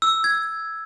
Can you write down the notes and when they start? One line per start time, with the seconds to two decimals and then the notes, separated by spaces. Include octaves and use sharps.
0.02 E6
0.24 G#6